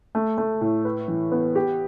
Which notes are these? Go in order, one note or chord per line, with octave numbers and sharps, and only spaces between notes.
A3
A3
A2
B4
E3
B3
G4